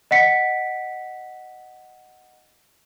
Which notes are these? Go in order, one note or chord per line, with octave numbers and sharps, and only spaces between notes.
D#5 F#5 B6 C#7